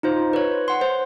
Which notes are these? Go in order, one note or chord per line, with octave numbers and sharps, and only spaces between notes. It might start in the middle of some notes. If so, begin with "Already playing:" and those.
D#4 F4 C5
B4 C#5
F#5 C6
C5